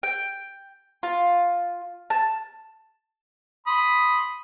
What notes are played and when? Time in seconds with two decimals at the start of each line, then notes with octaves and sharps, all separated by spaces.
0.03 G5
1.03 F4
2.10 A5
3.67 B5 C6 D#6